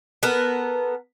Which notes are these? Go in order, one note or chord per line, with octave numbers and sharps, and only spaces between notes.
B3 A4 A#4